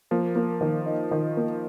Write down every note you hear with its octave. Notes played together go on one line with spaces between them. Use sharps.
F3 A#3
A#3
D#3
D#4
D#3
A#3